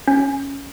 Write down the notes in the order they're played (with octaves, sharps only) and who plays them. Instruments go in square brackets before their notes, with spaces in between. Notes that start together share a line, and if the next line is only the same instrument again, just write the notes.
[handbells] C#4